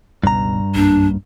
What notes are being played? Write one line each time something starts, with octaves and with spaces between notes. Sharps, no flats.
G1 C#2 G2 B2 A#5
B1 F#2 A#3 D4